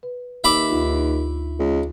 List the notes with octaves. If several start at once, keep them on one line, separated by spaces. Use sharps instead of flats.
B4
D#2 E5 B5 D6
D2 D#4 F4
C#2